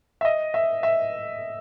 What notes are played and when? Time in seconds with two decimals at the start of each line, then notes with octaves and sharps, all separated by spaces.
0.21 E5
0.25 D#5
0.54 E5
0.83 E5